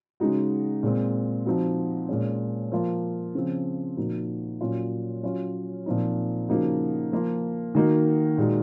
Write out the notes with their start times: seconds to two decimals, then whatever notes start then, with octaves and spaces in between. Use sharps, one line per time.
0.20 C#3 G#3 D#4 F#4
0.83 A#2 G#3 C4
1.46 F3 C4 D#4 F#4
2.09 A#2 G#3 C#4
2.72 F3 A#3 F4
3.35 C#3 F3 C4
3.97 A#2 F3 A#3 D#4 F#4
4.61 A#2 F#3 C#4 F4
5.23 F#3 C#4 F4
5.86 A#2 F3 C4 D#4
6.48 C#3 F3 A#3 D#4 F#4
7.12 F3 A#3 F4
7.75 D#3 A#3 D#4 F#4
8.38 A#2 G#3 D#4 F#4